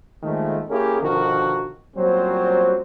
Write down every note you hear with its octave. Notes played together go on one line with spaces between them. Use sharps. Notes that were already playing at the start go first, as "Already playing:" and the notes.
A#2 D#3 F3 G#3 A3
A#3 C#4 E4 G4 G#4 A#4
B2 D3 D#3 F3 F#4 A#4
A#2 F#3 G3 C4 C#4 C5